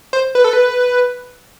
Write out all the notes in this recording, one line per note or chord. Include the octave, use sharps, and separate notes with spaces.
C5
B4
A4
B4